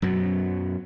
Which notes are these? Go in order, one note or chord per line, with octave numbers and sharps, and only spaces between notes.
F#2 B2 F#3